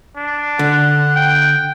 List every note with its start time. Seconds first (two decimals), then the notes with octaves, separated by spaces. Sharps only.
0.17 D4
0.59 D3 F#5
1.16 G5